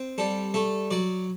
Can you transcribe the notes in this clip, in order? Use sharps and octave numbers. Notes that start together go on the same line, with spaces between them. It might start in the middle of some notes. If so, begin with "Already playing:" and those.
Already playing: C4
G3 A4
A3 A4
F#3 D5